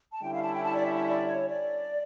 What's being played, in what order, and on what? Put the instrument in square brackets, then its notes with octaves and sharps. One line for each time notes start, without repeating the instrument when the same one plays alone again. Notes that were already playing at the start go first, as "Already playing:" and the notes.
[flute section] A5
[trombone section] D3 G3 C#4 E4 A4 [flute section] G5
[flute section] F5
A5
G5
A5
D5
E5
E5
D5
C#5
D5